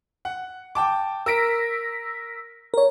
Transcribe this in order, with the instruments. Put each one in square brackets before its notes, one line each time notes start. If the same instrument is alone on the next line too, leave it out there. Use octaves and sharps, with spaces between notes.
[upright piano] F#5
G5 A5 D6
[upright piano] A#4 D7 [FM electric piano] E6 A#6 B6
[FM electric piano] A#4 C#5